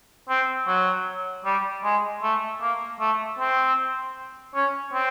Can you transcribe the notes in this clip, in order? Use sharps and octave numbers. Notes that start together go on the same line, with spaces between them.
C4
F#3
G3
G#3
A3
A#3
A3
C4
C#4
C4